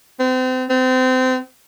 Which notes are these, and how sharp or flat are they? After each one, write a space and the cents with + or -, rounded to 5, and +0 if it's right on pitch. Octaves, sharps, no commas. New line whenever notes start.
C4 -35
C4 -30